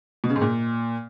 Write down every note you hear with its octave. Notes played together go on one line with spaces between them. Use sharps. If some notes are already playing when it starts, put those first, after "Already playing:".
B2
C#3
G#2
A#2